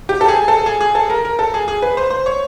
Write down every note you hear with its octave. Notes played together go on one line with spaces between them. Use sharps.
G4
A4
G#4
A4
G#4
G#4
A4
A#4
A#4
A4
G#4
G#4
B4
C5
C5
C#5